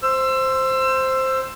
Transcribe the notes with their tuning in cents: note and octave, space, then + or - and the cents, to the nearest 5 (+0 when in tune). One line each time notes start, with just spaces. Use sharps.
C5 +0 E6 +25